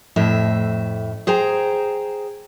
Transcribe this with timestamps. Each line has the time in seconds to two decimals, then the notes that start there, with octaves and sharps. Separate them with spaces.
0.16 F2 A2 E5
1.27 G#4 C5 G5 A#5